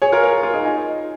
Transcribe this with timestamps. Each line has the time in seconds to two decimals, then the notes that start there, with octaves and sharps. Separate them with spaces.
0.02 G#4 C#5
0.12 F4 A#4
0.23 A#4
0.32 G#4
0.43 F4
0.54 D#4 G#4
0.65 D#4 G#4